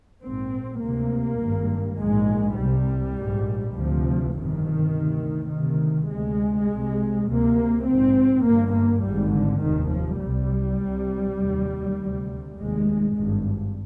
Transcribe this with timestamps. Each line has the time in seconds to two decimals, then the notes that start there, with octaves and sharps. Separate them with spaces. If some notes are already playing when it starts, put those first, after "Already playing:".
0.23 A#1 G#2 C4
0.82 D2 C3 A#3
1.41 G#1 G2
1.99 A#1 G#2 G#3
2.58 C2 C3 G3
3.16 A#1 G#2
3.76 D2 C3 F3
4.34 G1 F2 C3 D#3
4.94 D2 C3
5.52 D2 C3 D#3
6.10 D2 C3 G#3
6.69 C2 C3
7.28 D2 C3 A#3
7.87 A#1 G#2 C4
8.45 G1 G2 A#3
8.75 A#3
9.04 G#1 G#2 G3
9.33 D3
9.63 F1 D#2 D#3
9.93 F3
10.21 C2 C3 G3
10.81 C2 C3
11.39 F1 D#2
11.98 D2 C3
12.57 F1 D#2 G#3
13.15 G#1 G2